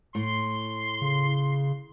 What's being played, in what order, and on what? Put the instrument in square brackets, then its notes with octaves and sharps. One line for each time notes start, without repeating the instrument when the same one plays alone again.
[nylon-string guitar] A2 [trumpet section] C6
[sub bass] C#3